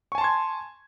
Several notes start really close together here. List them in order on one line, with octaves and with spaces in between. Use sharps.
C#6 G#5 A5 C6 G#6